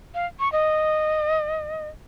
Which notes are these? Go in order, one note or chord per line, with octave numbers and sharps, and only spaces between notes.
F5
C#6
D#5